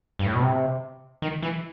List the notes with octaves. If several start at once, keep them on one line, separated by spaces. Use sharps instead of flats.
G2
A2
B2
C3
D#3
E3